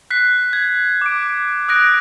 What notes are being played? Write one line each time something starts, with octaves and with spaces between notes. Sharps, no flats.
F#6 B6 C7
G#6
D6 D7
D#6 F#6 A#6 D7